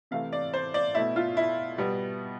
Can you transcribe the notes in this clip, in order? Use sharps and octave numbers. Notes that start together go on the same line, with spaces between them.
C3 E3 A3 F5
D5
C5
D5
B2 A3 E4
F4
E4
B2 G3 B3